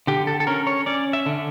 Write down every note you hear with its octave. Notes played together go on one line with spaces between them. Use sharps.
D3 G4
A4
A4
C#4 A#4
C#5
C#4 D5
E5
D3